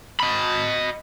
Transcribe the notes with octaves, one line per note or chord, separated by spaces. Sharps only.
D#5 B5